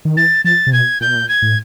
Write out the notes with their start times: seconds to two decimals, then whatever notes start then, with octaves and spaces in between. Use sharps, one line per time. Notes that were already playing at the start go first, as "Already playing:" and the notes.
0.05 D#3
0.17 E3 A6
0.44 F3 A6
0.67 C3
0.72 B2 G#6
1.01 A#2 G6
1.08 B2
1.15 A#2
1.28 G#6
1.42 A2